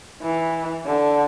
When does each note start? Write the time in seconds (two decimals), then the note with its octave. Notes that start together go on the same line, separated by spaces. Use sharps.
0.22 E3
0.85 D3